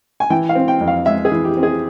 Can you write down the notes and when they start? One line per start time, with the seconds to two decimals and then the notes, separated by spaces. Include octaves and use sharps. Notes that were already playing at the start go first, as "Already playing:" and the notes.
0.20 G#5
0.30 E3 G5
0.49 F5
0.55 C4
0.68 G5
0.81 F2
0.88 F5
1.06 G#3 E5
1.25 G#4
1.32 E3
1.45 G4
1.57 C4
1.63 G#4